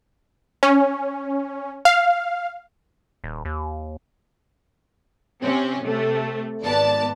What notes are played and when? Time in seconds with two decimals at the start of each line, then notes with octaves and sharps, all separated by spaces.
0.63 C#4
1.85 F5
3.24 D#1
3.45 D#2
5.43 C3 C4 C#4
5.84 C3 A3
6.63 G#1 B3 D5 A5